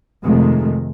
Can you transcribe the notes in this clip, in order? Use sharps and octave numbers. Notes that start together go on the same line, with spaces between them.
F2 C3 D#3 G#3 A3